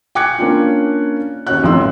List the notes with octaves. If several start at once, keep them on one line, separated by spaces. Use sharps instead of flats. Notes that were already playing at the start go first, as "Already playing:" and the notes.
G5 G#5 D6 F#6 G#6 C#7
A#3 C#4 D4 F4
D#2 C#4 F#4 C#5 F#5 F#6
A1 F3 F#3 C6 E6